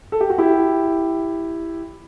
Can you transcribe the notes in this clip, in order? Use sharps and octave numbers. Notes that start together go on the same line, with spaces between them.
A4
G4
F#4
E4 G4